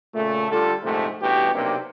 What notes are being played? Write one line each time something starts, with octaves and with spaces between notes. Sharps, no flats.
A#2 C#3 A3
D3 G3 F4 A4
A#1 G#2 C3 A3
A1 G2 B2 G4
B1 C3 A#3 C4 D4